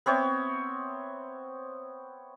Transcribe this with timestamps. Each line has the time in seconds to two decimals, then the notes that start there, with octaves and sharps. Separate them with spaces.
0.06 B3 C4 C#5 E5